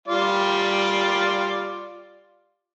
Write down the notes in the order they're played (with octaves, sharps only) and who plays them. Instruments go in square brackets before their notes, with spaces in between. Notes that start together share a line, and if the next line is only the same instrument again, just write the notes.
[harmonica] G3 F4 D5